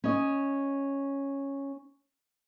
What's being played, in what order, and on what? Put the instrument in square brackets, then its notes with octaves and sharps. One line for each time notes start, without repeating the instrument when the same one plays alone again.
[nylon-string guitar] C#4 D#5